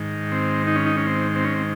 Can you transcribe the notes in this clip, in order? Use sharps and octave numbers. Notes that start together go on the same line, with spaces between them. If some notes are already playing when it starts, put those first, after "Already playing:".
Already playing: G#2 D#3
C4
D#4
C#4
D#4
C#4
C4
C4
C#4
C4